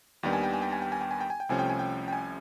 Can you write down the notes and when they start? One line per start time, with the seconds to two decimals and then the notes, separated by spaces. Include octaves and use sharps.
0.23 D#2 D#3 G3 B3 D4 G5
0.33 G#5
0.43 G5
0.53 G#5
0.62 G5
0.72 G#5
0.82 G5
0.92 G#5
1.01 G5
1.11 G#5
1.21 G5
1.30 G#5
1.40 G5
1.49 C2 C3 F3 A3 C#4 G#5
1.59 G5
1.70 G#5
1.79 G5
2.08 G5
2.13 G#5